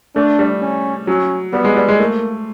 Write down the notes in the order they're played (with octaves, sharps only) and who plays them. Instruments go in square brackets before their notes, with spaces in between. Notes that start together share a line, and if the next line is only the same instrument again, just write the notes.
[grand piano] A3 [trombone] D4
[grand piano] G3
[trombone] C#4
[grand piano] F#3 [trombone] C#4
[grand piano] G3 [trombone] B3
[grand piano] G#3
G3
G#3
[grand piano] A3 [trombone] A#3